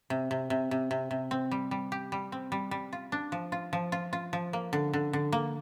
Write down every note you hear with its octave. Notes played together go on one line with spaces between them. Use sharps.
C3
C3
C3
C3
C3
C3
C4
G3
G3
G4
G3
C4
G3
G3
F4
D4
F3
F4
F3
F4
F4
F3
A#3
D3
D3
D3
A#3